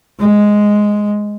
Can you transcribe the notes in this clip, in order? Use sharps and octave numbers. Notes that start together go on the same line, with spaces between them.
G#3